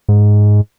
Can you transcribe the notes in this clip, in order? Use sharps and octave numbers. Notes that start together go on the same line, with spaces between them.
G#2